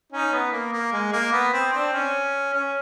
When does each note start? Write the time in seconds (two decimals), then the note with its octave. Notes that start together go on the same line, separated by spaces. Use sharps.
0.12 C#4 D#4
0.32 B3
0.52 A#3
0.73 A#3
0.92 G#3
1.13 A#3
1.33 B3
1.53 C4
1.73 C4 D4
1.93 C#4
2.53 C#4